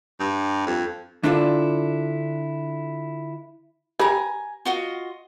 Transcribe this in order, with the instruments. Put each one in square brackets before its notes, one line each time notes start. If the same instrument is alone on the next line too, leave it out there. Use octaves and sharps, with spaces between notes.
[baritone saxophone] G2
F2
[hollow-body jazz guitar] D3 D4 E4 F4 G#4 A4
[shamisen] G4 B4 [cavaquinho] G#5 A#5
[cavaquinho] F4 F#4 D#5